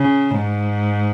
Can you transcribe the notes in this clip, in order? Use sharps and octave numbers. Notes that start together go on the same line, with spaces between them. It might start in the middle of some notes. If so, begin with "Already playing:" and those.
Already playing: C#3
G#2